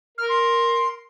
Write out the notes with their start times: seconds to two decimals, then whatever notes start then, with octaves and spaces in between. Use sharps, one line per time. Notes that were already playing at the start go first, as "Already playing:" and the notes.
0.18 A#4 F6
0.29 C6